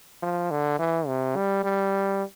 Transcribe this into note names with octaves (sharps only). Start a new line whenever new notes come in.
F3
D3
E3
C3
G3
G3